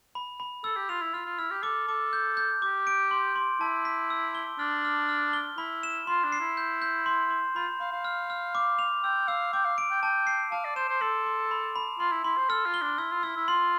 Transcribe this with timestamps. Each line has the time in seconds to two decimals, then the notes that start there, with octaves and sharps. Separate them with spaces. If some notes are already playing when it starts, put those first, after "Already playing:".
0.15 B5
0.40 B5
0.64 A4 E6
0.76 G4
0.89 F4 F7
1.02 E4
1.14 F4 F6
1.26 F4
1.39 E4 F6
1.51 G4
1.63 A4 D6
1.88 A4 D6
2.13 G6
2.37 G6
2.62 G4 D6
2.87 D7
3.11 C6
3.36 C6
3.60 E4 A5
3.85 B6
4.10 E6
4.35 G7
4.59 D4 F6
4.85 F6
5.09 F6
5.33 G7
5.58 E4 B5
5.83 E7
6.07 F4 C6
6.24 D4
6.32 C7
6.40 E4
6.57 G6
6.82 G6
7.06 C6
7.30 C6
7.56 F4 B5
7.80 F5 B5
7.92 F5
8.05 F6
8.30 F6
8.55 D6
8.79 F7
9.04 G5 E6
9.28 F5 E6
9.53 G5 D6
9.65 F5
9.78 D7
9.91 G5
10.02 G5 A5
10.27 C7
10.52 F5 A5
10.65 D5
10.76 C5 E7
10.89 C5
11.01 A4 C6
11.26 C6
11.51 B5
11.76 B5
11.99 F4 C6
12.12 E4
12.24 E4 C6
12.37 C5
12.49 A4 F6
12.66 F4
12.74 G7
12.82 D4
12.98 E4 E6
13.11 F4
13.23 E4 E6
13.36 E4
13.48 F4 C6